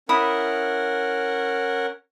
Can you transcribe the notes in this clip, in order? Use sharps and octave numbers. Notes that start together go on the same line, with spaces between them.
C#4 E4 A#4 F#5 B5 D#6